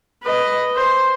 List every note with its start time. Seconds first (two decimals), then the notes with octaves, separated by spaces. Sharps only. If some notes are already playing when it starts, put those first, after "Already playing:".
0.23 B4 D#5
0.76 C5